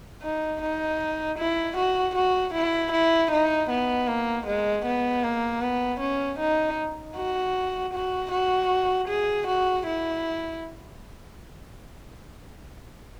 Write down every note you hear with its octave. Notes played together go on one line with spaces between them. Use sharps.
D#4
D#4
E4
F#4
F#4
E4
E4
D#4
B3
A#3
G#3
B3
A#3
B3
C#4
D#4
F#4
F#4
F#4
G#4
F#4
E4